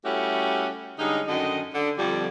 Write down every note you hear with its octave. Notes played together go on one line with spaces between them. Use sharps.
G3 A3 C#4 E4 F#4 G4
D3 G3 G#3 C#4 D#4
F#2 D3 D#3 D#5
D3
F2 D3 G3